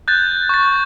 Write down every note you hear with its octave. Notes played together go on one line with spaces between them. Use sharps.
F#6 G6 A6
C#6 A6